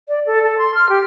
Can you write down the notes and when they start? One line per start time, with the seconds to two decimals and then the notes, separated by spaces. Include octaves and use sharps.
0.08 D5
0.26 A4
0.44 A4
0.58 C6
0.75 F6
0.89 G4